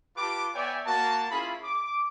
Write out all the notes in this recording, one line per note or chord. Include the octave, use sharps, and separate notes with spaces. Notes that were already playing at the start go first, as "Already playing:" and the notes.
F4 G4 B4 A5 D6
B3 C#5 D5 E5 G5 G#5
A#3 F#4 A5
C#4 E4 F4 G#4 B5
D6